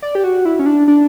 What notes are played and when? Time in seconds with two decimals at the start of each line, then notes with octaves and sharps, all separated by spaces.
0.02 D5
0.15 G4
0.24 F#4
0.45 E4
0.59 C#4
0.66 D4
0.88 D4